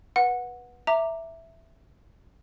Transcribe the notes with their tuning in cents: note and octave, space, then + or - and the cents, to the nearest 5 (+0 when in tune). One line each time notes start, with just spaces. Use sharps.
B4 -15 F#5 -15
E5 +0 A#5 -15 D6 +0